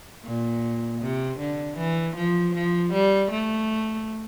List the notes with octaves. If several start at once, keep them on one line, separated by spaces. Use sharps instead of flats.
A#2
C3
D3
E3
F3
F3
G3
A3